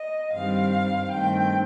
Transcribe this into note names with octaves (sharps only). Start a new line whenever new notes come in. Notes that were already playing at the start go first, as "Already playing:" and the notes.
Already playing: D#5
G2 D#3 G3 C4 F5
G2 D#3 A3 C4 G5